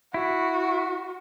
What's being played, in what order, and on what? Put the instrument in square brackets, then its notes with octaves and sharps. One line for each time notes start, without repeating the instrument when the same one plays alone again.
[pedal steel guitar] E4 [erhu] F#4